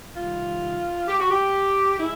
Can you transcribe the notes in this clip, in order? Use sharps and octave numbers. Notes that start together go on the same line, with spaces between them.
F2 C3 D#3 G3 F4
G4
F#4
G4
G#3 E4